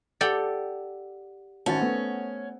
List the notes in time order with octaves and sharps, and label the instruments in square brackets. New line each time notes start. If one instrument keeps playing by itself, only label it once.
[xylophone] G4 F#5 [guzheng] A4 D5 G5
[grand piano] G#1 F#4 A5 [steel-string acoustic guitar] C#4 [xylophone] C5 F#5 A6
[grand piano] A3 B3